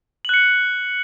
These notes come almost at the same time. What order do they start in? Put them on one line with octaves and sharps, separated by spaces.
F#7 F#6 C#7